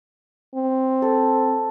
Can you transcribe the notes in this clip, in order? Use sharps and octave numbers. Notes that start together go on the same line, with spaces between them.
C4
A4